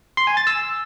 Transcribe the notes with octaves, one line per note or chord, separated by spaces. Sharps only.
C6
G#5
A6
E6